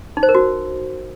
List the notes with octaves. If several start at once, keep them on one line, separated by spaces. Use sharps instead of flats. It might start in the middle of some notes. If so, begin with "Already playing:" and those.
D#4
C5
A#4
F#4